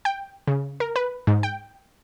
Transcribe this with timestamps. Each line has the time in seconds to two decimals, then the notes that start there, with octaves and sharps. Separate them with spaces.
0.05 G5
0.47 C#3
0.80 A#4
0.96 B4
1.27 G#2
1.43 G5